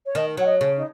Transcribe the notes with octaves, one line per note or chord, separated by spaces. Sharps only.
C#5
D#3 D#5
F#3 F#5
D#5
C#3
D#4